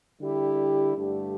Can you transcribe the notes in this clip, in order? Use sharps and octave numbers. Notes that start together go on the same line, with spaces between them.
D3 G3 E4 G4
G2 D3 A3 G4